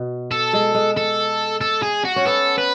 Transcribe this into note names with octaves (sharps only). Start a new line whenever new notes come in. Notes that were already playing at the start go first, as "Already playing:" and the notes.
Already playing: B2
A4
G#3
G#3
A4
A4
G#4
F#4
C#4
B3 A4
B4